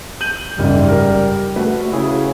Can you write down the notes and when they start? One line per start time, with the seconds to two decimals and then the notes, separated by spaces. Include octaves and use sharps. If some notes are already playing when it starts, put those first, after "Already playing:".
0.21 G6 D#7 F#7
0.58 F#1 G#2 C#3 G3
0.88 A#4
1.56 A3 F#4 B4
1.92 C#3 E4 G#4